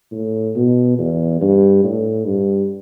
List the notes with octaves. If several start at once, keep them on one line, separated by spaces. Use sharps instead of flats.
A2
B2
E2
G2
A2
G2